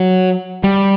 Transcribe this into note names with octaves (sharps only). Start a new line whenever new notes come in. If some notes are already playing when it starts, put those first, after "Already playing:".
Already playing: F#3
G3